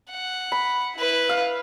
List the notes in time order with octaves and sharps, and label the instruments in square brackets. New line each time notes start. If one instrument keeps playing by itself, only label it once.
[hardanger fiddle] F#5
[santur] B5
[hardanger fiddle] E4 B4
[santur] F5